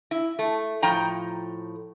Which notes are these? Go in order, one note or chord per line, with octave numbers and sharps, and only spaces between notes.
E4
A3
A2 F3 G5 A#5